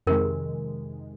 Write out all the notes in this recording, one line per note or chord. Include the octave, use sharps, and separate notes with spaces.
F2 C3 D#3 G#3 A#4